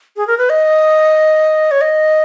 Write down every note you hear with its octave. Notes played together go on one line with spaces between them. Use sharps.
G#4
A#4
B4
D#5
C#5
D#5